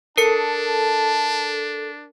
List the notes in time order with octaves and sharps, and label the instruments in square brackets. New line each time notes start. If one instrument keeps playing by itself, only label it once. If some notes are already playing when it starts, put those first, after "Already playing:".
[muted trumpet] D4 [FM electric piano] A4 [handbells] A#4 C#7 [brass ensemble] A5